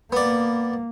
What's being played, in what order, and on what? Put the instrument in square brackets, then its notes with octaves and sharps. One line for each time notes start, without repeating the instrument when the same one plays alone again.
[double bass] A#3 [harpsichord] B3 D5